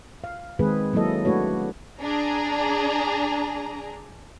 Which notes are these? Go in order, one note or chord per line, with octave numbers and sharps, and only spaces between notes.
F5
D#3 G#3 C4 G#4 B4
F#3 A#3 E4 A4 D#5
A3 D4 F#4 B4 C#5
D4 G#4 A#5